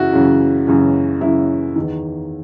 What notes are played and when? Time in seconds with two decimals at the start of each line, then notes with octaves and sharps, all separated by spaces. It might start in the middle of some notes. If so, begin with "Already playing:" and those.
Already playing: F#2 C#3 E3 E4 F#4
0.12 F#2 C#3 E3
0.67 F#2 C#3 E3
1.21 F#2 C#3 E3 E4
1.76 E2 D#3